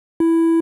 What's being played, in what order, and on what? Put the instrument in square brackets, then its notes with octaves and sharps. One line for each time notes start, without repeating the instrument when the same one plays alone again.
[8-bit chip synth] E4